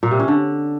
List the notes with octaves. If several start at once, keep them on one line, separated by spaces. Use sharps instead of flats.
A#2
C3
C#4
D3